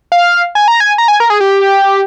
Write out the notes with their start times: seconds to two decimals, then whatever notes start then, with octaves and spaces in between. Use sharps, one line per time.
0.12 F5
0.55 G#5
0.68 A#5
0.80 G#5
0.98 A#5
1.08 G#5
1.20 A#4
1.30 G#4
1.40 G4